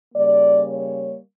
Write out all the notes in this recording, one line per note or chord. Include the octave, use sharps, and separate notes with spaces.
C#3 G3 A#3 D5
C#5